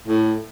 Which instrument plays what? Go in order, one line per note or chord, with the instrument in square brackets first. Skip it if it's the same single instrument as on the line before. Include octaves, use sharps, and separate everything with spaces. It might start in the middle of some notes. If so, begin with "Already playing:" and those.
[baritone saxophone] A2